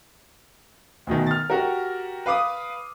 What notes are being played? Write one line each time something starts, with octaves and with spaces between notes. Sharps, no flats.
D2 B2 D#3
F6 A6
F#4 G4 A#4
B4 F5 D6 D#6